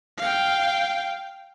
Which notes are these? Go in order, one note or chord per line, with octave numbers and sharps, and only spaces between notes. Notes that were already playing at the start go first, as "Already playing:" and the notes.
F5 G5